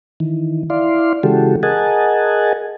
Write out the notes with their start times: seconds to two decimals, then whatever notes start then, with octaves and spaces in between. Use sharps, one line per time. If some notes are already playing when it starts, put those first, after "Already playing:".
0.20 D#3 E3
0.70 E4 D5 F5 C6
1.23 C#3 E3 G#3 F#4 G4 A4
1.63 G#4 A#4 D#5 F#5 G#5 A5